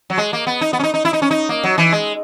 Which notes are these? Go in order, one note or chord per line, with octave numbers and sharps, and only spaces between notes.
F#3
G#3
A#3
B3
D#4
B3
C#4
D#4
D#4
E4
D#4
C#4
D#4
A#3
F#3
E3
G#3